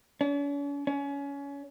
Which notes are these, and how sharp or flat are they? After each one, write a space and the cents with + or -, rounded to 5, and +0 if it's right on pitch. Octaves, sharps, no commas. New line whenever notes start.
C#4 +45
C#4 +25